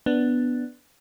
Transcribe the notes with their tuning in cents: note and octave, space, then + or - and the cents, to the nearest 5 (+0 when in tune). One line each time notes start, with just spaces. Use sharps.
B3 +0 D4 +0